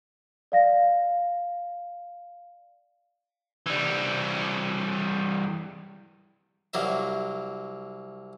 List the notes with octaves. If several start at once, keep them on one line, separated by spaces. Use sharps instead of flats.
D5 F5 A#6
E3 G3
C2 F#3 A#3 E5